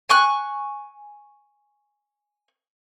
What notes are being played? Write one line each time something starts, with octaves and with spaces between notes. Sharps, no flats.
G#5 C#6 F#6